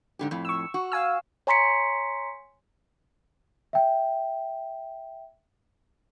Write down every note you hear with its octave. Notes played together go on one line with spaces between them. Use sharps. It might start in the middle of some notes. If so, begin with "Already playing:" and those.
G#2 D3 G4
F2 A2
C#6 E6
F#4
F5 G#5 E6
C#5 G#5 A#5 C6 B6 C#7
E5 G5